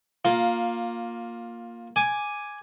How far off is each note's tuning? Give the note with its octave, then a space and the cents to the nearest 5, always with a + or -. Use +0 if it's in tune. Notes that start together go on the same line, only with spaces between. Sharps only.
A#3 +0 F4 +15
G#5 +0 D6 +0